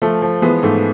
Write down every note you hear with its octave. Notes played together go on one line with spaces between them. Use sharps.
F3 A3
F3
E3 G#3 B3
G#2 A3